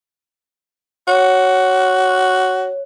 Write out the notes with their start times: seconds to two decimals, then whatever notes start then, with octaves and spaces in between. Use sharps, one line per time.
1.08 F#4 C#5